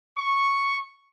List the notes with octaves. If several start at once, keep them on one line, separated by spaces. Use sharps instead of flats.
C#6